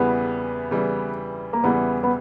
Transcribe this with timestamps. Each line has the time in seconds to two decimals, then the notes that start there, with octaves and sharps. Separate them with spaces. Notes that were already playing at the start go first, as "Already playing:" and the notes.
Already playing: E2 C#3 E3 G3 B3
0.71 E2 C#3 E3 G3
1.53 A#3
1.64 E2 C#3 E3 G3 B3
2.03 B3